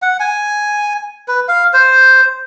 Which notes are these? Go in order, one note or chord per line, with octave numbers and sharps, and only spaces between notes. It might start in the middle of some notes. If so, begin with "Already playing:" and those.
F#5
G#5
B4
F5
C5